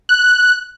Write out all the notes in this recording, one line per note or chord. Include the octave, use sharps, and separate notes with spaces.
F#6